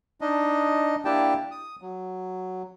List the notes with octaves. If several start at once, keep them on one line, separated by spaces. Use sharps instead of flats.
D4 D#4 D#5
A#3 D4 E4 G4 G5 A5
D#6
F#3